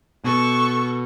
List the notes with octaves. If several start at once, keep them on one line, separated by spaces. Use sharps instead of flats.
B2 A4 C#6